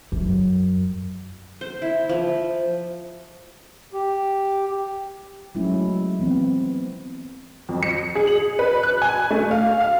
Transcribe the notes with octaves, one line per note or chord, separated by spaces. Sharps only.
F#2
C5
E4
F3
G4
F#3 G#3 A3 C#4 E4
E3 B3 C4
F2
C#7
G#4
F#7
B4
F#6
G#5
A3
F5
F5